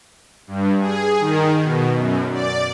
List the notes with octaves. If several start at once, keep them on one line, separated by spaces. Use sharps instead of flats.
G2
G#4
D#3
B2
F#2
D5